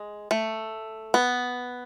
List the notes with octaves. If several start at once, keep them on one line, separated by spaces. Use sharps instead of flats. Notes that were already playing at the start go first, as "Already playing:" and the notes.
Already playing: G#3
A3
B3